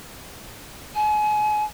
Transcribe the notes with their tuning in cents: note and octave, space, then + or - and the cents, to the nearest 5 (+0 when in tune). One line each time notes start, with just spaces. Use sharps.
G#5 +35